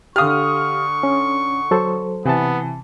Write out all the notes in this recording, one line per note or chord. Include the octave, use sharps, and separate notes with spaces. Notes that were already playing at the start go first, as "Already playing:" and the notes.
D3 G4 F5 C#6 D#6 F6
C#4
F#3 A4 C5
C3 E3 B3 A5